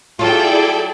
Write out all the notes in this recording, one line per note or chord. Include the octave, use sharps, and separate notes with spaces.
F#3 E4 F4 G#4 A4 D5 G5